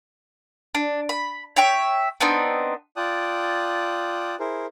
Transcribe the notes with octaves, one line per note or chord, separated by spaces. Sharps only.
D4
B5
C#5 E5 G5 C#6
B3 C4 D4 D#4
F4 D5 G5 A5 D#6 F#6
E4 G#4 A#4 C5